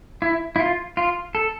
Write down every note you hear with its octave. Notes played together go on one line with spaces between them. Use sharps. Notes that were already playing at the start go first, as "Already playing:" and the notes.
E4
E4
F4
F4
A4